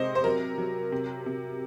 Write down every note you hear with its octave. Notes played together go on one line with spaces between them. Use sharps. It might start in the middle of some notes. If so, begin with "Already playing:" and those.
Already playing: C3 G#3 C5 D#5
C5
F#3 A#4
F#3
C3
C3